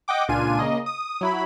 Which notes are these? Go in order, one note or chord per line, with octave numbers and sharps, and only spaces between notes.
D#5 F#5 G5 D6
C#2 A#2 D4 F4 G#5 D#7
C#3 A#3 D#5
D#6
F#3 E4 B5